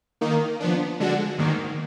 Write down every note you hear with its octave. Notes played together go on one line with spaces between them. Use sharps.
D#3 A#3 D#4
F3 B3 D4
D3 G#3 D4 F#4
G#2 D#3 A#3